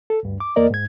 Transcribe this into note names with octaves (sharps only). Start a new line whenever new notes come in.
A4
D2 G2
D6
E2 A#3 A#4 D5 D#5
G#2 G#6